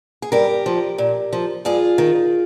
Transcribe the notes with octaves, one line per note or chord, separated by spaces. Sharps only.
G#4
G2 G4 A#4
F3
A#2
F3
G2 F4 G#4
D#3